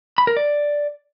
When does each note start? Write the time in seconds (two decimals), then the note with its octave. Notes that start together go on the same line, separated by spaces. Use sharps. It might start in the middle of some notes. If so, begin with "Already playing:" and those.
0.18 B5
0.27 A#4
0.37 D5